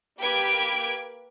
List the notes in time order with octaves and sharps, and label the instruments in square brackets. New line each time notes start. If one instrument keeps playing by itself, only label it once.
[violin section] A#3 G4 B4 B5 G#6 D7